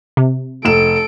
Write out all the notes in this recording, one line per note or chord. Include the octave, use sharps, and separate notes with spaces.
C3
F1 A4 D7 E7